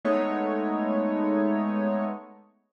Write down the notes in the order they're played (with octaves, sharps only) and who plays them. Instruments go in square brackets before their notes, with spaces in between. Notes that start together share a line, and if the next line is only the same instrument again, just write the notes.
[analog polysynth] G#3 A3 B3 D#4 C#5